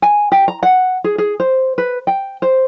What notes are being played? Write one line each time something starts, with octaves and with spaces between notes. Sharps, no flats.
G#5
G4
A#5
F#5
G#4
G#4
C5
B4
G5
C5